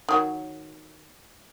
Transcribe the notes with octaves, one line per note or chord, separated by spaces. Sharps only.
D#3 F#3